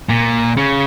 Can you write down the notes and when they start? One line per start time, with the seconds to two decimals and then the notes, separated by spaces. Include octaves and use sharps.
0.09 A#2
0.57 C#3